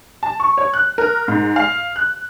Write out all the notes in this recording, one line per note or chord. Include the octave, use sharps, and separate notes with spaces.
A5
C#6
C#5
F#6
A#4
G#2
F5
F#6